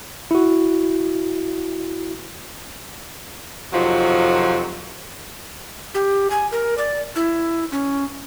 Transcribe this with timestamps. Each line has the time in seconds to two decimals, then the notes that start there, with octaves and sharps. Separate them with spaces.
0.31 E4 F#4
3.73 F2 C3 D#3 F3 F#3
5.95 G4
6.30 G#5
6.52 A#4
6.78 D5
7.16 E4
7.72 C#4